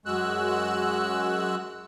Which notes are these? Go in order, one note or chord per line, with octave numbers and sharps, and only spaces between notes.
F#2 G#3 F#4 E6 F#6